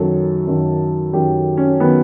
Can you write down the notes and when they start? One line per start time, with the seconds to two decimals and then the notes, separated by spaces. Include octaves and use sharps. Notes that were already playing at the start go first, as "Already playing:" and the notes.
Already playing: F#2 D#3 F#3 A4
0.47 F#2 D#3 F#3
1.13 F#2 D#3 F#3 G4
1.57 C#4
1.80 D#3 F#3 B3